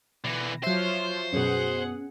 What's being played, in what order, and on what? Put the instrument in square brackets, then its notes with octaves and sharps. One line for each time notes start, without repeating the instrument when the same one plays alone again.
[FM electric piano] B2 A#6 [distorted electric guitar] D3 E3
[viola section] F3 F4 C#5 [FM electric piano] F#3 E5 [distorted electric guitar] C5
[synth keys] F#2 B2 [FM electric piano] C#4 [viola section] G#4 F#5